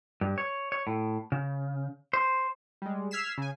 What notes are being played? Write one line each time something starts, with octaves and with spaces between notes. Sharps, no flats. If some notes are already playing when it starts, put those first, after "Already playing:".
G2
C#5
C#5
A2
C#3
C5
G3 G#3
E6 F6 G#6 B6 C7 E7
C#3 G#5